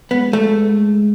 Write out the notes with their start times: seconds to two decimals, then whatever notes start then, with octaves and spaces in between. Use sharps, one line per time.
0.11 G#3 B3
0.33 A3